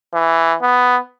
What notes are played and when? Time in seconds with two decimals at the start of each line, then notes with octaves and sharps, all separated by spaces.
0.13 E3
0.61 B3